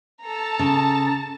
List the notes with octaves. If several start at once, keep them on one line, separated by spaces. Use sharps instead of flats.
A4 A5 A#5
C#3